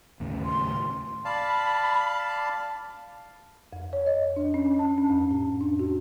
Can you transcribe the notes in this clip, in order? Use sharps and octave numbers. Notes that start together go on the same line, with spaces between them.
D#2 A2 C#3
C6
D5 F5 A5 B5
F2
C#5
D#5
D4
C#4
A5
C#4
F2
A2
D4
F#4